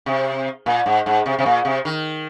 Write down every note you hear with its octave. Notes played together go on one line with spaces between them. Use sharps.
C3
A#2
G#2
G#2
C3
C3
A#2
C3
D#3